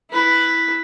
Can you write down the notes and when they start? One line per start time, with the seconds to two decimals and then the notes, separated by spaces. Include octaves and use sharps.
0.10 E4 B4